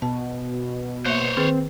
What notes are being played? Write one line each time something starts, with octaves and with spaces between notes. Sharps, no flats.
B2 A5
A#3 C5 C#5 E5
D#3 C4 G#4 B4